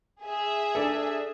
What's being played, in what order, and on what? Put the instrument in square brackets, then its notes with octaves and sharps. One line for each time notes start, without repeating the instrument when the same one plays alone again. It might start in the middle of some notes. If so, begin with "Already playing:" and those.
[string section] G#4 E5
[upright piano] D4 A4